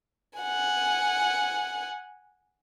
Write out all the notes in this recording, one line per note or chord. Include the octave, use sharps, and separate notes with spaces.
F#5 G#5